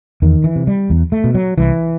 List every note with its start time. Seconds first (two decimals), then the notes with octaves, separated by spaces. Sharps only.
0.22 E2 D#3
0.44 E3
0.56 C3
0.67 G3
0.90 E2
1.12 A3
1.24 B2
1.34 F#3
1.58 C2 E3